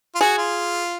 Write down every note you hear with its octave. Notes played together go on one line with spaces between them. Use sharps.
F4
F#4 G#4
F4